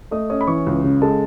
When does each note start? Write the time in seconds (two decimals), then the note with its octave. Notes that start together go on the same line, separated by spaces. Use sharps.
0.11 A3 D#5 D#6
0.30 C#4 D#5 D#6
0.41 B5
0.47 E3 C#5 C#6
0.66 C#2
0.84 C#3
1.02 G#3 A4 A5